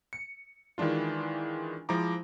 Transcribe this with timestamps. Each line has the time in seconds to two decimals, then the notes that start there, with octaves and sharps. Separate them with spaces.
0.13 C#7
0.78 D#3 E3 G#3 D4 F4
1.89 F3 G#3 E4 A#5 D6